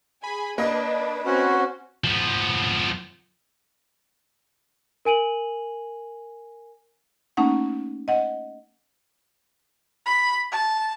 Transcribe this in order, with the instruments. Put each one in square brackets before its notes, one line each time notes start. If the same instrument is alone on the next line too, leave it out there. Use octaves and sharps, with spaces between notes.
[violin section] G#4 G#5 [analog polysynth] B5
[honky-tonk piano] A#3 D#5 [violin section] D4 [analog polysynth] B4
[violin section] C4 C5 F#5 [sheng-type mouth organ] C#4 F#4
[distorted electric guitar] F3 B3
[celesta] A#4 G#5 D#7 F#7
[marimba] A3 A#3 C#4 D#4 F#5
D#5 F#5
[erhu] B5
A5